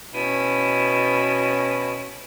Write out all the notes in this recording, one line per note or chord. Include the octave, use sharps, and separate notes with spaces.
B2 C#4 E4 D#7